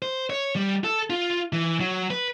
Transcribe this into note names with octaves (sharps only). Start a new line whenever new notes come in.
C5
C#5
G3
A4
F4
E3
F#3
B4